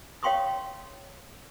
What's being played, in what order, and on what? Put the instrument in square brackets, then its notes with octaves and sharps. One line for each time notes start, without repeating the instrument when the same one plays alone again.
[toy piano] C#5 F5 G5 C6 C#6 D#6